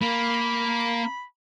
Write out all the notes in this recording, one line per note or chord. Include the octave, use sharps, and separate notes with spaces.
A#3 B5